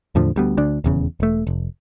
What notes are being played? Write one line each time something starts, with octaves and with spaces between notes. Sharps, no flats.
E2 A2 D3 F3
D2 G3 B3
D2 D4
D#1 E2 C#3
E1 A3
F1